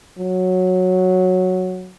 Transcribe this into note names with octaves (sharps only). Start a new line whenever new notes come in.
F#3